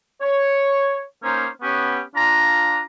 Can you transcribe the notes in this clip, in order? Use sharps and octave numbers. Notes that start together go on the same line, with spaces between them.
C#5
A#3 C#4 D#4 C5
B3 C#4 G4
D4 F4 A#5